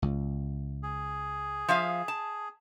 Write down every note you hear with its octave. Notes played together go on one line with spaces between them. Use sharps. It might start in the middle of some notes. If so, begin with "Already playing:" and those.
C#2
G#4
F3 E5 F5
A5